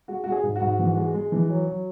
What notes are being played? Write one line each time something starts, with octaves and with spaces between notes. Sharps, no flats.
G#3 F#4
G#3 F#4
G#4
G#2
F#4
G#2
E3
G#3
G#3
E3
F#3
F#3